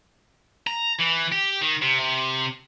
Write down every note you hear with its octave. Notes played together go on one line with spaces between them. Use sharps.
A#5
E3
G4
D#3
C3
C3